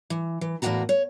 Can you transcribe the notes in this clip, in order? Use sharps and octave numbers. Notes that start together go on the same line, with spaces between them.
E3
E3
E2 A2 C3 A#3 F#4 A#5
C#5